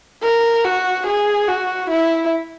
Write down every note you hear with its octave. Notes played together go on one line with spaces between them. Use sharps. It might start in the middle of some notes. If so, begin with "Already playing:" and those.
A#4
F#4
G#4
F#4
E4